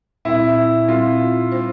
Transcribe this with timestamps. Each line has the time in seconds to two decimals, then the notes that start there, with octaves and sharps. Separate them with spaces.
0.25 A#2 G3 C4 E4
0.88 A#2 G3 C4 F4
1.52 G3 D4 F4 C5